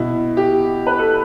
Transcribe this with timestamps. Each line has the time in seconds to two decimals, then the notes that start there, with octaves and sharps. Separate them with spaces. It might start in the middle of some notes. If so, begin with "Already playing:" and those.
Already playing: B2 E4
0.37 G4
0.86 B4
0.99 A4